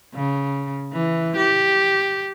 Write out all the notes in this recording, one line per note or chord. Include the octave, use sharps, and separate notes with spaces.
C#3
E3
G4